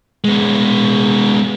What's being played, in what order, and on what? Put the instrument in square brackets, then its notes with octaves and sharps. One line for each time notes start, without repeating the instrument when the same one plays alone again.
[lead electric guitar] G#3 B3